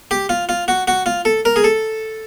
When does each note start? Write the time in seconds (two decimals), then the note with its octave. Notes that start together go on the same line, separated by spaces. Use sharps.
0.11 G4
0.29 F4
0.49 F4
0.68 F#4
0.88 F#4
1.06 F4
1.25 A4
1.45 A#4
1.56 G#4
1.64 A4